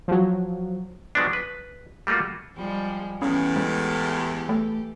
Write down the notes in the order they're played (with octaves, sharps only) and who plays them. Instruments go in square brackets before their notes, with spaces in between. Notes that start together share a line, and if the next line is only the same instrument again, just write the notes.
[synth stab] F3 F#3
[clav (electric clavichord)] F3 F#3 G#3 B3 D4
B4
G3 A3 A#3 F4 F#4
[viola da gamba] F3 G3 G#3
[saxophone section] E2 A2 [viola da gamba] E3 G4 A4 [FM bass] C#4
[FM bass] G#3
A3